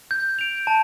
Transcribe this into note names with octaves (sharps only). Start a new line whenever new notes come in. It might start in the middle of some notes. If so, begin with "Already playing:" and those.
G6
D7 F7
A5